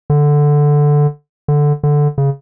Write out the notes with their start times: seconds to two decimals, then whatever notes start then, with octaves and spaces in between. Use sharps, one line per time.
0.10 D3
1.48 D3
1.83 D3
2.18 C#3